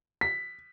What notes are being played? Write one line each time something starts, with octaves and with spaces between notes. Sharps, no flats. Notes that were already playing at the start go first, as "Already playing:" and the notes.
B6